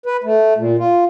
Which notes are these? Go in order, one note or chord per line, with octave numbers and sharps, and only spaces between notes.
B4
A3
A#2
F4